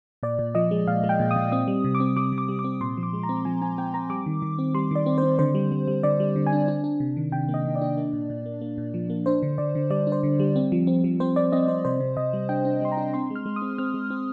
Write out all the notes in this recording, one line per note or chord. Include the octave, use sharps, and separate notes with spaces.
A#2 D5
A#2
F3 D#5
G#3
A#2 F5
G#3
G5
A#2
D#6
A#2
C4 D#6
G3
C3
D6
C4
G3 D6
C3
D6
G3
D6
C4
A#2 C6
F3
D6
G#3
A#5
C4
F3 G#5
C4 G#5
C4 G5
C4 A#5
G3 D6
D#3
D#3
C4
G3 C6
D#3 D5
C4
C5
C4
D3 C5
G3
G3
G3
D3 D5
G3
D3
G#5
D4
D4
D4
C3
D#3
C3 G5
A#3
D#5
D#3
D5
D4
A#3
A#2
A#2
A#3
A#3
A#2
F3
A#3
D4 C5
D3
D3 D5
D3
G3 D5
D4
C5
D3
G3
C4
F3
C4
F3
C4 C5
C4 D5
C4 D#5
C4 C5
C3 C5
C3
C3 D#5
G3
D4 G5
D4
G3 C6
A#5
D4
C4 C6
G#3
F6
G#3
D#6
C4
C4 F6
G#3
C4